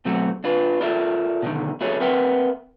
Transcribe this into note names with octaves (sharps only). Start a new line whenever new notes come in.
B2 F#3 A3 C4 F#4
D4 F4 B4
F4 A4 A#4 D5 E5
B2 D3 D#3
E4 F#4 G#4 A4 C#5
C4 A#4 B4 E5 F#5 G5